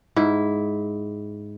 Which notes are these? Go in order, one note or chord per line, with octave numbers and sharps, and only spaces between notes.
G#2 E4